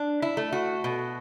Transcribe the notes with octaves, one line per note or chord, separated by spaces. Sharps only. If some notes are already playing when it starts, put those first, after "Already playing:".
Already playing: D4
E4
A3
F#4
B2